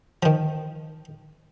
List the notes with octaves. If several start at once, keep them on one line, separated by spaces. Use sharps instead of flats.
D#3 F3